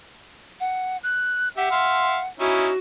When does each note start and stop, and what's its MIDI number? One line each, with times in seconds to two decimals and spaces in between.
0.60 0.97 78
1.03 1.49 90
1.57 1.67 67
1.57 1.67 76
1.57 2.27 78
1.71 2.19 76
1.71 2.19 77
1.71 2.19 84
2.40 2.69 61
2.40 2.69 63
2.40 2.69 64
2.40 2.79 66